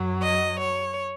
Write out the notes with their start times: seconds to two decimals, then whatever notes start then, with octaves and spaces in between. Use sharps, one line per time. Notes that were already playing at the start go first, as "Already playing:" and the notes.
Already playing: F#2 F#3
0.22 D#5
0.59 C#5